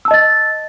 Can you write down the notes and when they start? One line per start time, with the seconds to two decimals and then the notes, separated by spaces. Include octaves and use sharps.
0.05 E6
0.08 A5
0.11 D#5
0.14 A6